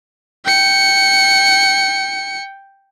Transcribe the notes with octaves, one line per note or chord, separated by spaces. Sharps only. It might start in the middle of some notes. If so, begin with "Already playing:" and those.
G5 C#7